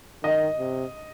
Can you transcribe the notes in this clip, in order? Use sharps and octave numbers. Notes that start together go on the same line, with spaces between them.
D#3 D#5
C3